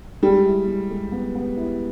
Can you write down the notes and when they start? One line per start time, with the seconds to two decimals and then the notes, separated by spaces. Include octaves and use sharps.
0.23 G3 G#3
0.46 E4
0.67 G#3
0.90 G#3
1.12 B3
1.35 B3
1.57 E4